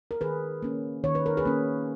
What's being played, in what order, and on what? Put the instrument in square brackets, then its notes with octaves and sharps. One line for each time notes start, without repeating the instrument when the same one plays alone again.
[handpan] A#4
D#3 G#4 B4
A#3 C#4
D#3 C#5
B4
A#4
G#4 B4
A#3 C#4